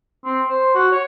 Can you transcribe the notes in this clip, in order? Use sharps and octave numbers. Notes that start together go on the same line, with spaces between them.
C4
C5
F#4
C#5